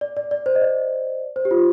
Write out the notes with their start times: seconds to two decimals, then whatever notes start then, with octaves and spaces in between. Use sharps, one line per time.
0.01 D5
0.17 D5
0.31 D5
0.46 C5
0.55 D#5
0.61 D5
1.36 C5
1.45 G4
1.51 F4